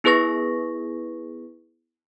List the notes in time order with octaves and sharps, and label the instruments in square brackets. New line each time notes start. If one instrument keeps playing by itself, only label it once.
[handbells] B3 E4 G#4 B4 C#6 A#6